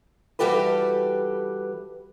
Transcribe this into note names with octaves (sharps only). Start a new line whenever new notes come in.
E3 G3 F#4 G4 A4 B4